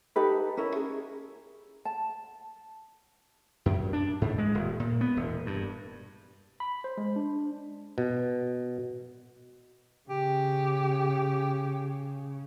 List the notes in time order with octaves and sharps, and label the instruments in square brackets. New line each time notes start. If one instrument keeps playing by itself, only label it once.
[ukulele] D#4 G4 A4 B4
C#4 E4 A#4
G#4
A5
[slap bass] F#2
D4
G#2
G#3
D#1
A#2
B3
E1
G2
[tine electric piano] B5
C5
G#3
D4
[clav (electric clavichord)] B2
[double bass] C#3 [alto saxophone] G4